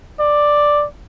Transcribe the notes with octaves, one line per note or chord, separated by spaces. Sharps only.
D5